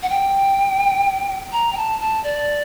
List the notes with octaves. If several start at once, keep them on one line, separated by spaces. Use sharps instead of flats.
F#5
G5
A#5
G5
A5
A5
D5